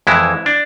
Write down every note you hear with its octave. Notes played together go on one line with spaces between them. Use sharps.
F2 E3 G#3 E4
D4